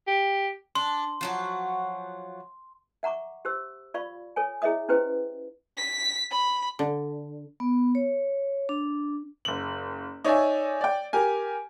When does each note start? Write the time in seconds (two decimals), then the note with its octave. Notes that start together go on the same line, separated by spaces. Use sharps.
0.07 G4
0.75 D4 C6
1.21 F3 F#3 F#4
3.03 E5 F#5 A#5 C#6 D6
3.45 G4 C5 E6
3.94 F4 D5 F5 B5 C#6
4.36 A4 C#5 G#5
4.62 E4 G#4 C#5 D#5 E5 D#6
4.89 C#4 E4 G4 B4 C5 G5
5.77 B6
6.31 B5
6.79 D3
7.60 B3
7.95 C#5
8.69 D4
9.45 F#1 F#7
10.24 D#4 C#5 D5 E5 G#5
10.81 D5 G5
11.13 G4 A#4 G#5